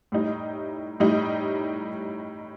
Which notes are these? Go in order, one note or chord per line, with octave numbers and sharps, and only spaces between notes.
A2 G3 D#4
A2 G3 D#4